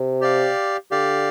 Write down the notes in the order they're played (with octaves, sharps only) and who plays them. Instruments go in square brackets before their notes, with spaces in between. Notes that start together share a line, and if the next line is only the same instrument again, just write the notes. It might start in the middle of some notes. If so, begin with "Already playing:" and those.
Already playing: [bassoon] C3
[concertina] G4 D5 F5
[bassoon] D3 [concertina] G4 D5 F5